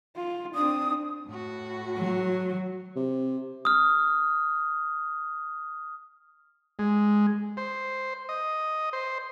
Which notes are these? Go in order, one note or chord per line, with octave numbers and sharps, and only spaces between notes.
F4
C4 D4 D#6
A2 F#4
F#3
C3
D#6 F6
G#3
C5
D#5
C5